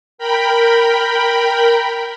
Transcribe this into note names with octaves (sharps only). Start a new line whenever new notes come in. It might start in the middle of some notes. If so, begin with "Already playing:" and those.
A#4 G5 B5